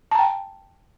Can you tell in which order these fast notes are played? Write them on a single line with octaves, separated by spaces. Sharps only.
A5 A#5 G5